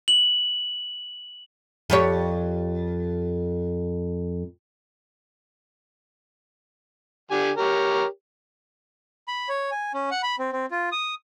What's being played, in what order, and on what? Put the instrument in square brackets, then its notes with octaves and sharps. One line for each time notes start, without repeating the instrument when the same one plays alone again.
[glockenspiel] F#7
[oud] F2 G4 C#5
[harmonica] D3 G4 G#5
G4 A#4 C#5
[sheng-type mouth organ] B5
C#5
G#5
C#4
F#5
B5
C4
C4
F4
D#6